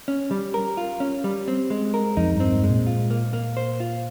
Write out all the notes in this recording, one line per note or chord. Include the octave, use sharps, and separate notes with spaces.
C#4
G3
A#4
F4
C#4
G3
C4
G#3
A#4
F2 D#4
G2
C4
G#2
G#3
A#2
F4
A#3
A#3
C5
F4